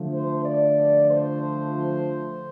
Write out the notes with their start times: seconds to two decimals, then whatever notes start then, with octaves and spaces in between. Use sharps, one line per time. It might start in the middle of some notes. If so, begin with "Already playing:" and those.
Already playing: D3 F3 A3
0.13 C5
0.45 D5
1.11 C5